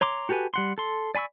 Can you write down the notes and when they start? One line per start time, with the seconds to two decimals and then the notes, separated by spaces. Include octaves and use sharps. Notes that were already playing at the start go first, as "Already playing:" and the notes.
0.01 C#5 A#5 C6 D6
0.29 F#4 G4 A4 B4 G#5
0.54 G3 F#5 C6
0.78 A4 C6
1.15 D5 G#5 B5 C#6 E6